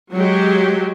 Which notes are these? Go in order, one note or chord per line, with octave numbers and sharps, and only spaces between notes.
F#3 G#3 G4